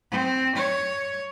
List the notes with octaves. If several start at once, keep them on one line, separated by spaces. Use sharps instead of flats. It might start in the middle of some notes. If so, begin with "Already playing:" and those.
C4
C#5